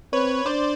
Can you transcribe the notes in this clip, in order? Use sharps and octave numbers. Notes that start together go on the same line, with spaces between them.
C4 B4 C#5
D4 C5 D5